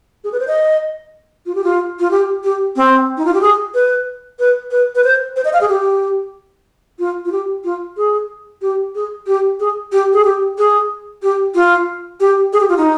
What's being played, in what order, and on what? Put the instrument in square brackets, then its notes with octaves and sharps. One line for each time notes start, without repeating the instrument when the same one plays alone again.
[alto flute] G#4
B4
C5
D#5
F4
G4
F4
F4
G4
G4
C4
D#4
F4
G4
G#4
B4
B4
B4
B4
C5
C5
D#5
F5
G#4
G4
F4
F4
G4
F4
G#4
G4
G#4
G4
G#4
G4
G#4
G4
G#4
G4
F4
G4
G#4
G4
F4
D#4